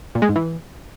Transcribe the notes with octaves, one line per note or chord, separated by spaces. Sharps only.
A#2
G#3
G#2
E3